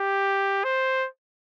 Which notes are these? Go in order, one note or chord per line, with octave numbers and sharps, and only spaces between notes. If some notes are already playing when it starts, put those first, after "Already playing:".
Already playing: G4
C5